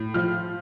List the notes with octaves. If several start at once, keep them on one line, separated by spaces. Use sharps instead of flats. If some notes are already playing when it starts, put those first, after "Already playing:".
Already playing: A2
F3 F6